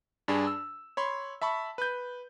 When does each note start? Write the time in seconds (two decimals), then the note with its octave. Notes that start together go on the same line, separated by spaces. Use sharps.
0.28 G2 D4 G#4
0.47 E6
0.97 C#5 B5 C6
1.41 E5 A5 B5 C#6
1.78 B4 G6